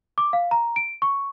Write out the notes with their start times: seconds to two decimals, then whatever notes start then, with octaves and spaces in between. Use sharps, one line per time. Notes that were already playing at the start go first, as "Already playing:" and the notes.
0.18 D6
0.33 F5
0.51 A#5
0.76 D7
1.02 C#6